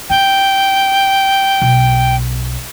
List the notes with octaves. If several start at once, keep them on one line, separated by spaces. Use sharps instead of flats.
D#4 G5
B1